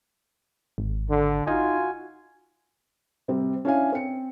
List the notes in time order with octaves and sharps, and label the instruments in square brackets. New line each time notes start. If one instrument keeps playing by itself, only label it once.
[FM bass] G#1
[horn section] D3
[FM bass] D#4 [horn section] F4 F#4 G#5
[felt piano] C3 G3 C4
C#4 D4 E4 C#5 F5 G#5
C4 C#7